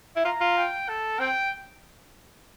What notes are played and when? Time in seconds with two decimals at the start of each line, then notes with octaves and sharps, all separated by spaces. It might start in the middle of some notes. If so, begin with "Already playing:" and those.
0.16 E4
0.25 F4 A#5
0.41 F4
0.57 G5
0.88 A4
1.19 C4 G5